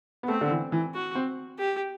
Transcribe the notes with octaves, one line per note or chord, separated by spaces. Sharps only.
B3
A3 C4
D3
E3
E3
F#4
C4
G4